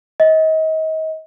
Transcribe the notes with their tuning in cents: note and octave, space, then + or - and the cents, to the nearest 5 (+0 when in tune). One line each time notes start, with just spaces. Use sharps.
D#5 +35